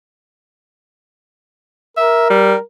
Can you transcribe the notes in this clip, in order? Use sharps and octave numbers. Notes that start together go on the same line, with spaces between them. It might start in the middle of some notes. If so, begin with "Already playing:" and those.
A#4 E5
G3